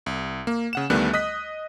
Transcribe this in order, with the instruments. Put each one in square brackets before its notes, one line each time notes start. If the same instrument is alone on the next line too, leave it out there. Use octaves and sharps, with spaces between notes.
[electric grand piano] C2
A#3
C#3 F#5 E7
D2 D#3 G3 A3 B3 F#6
D#5 D#6 F#6 B6